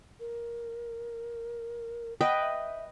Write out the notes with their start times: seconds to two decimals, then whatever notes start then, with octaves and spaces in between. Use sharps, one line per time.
0.20 A#4
2.21 B4 D#5 F#5 G5
2.41 E5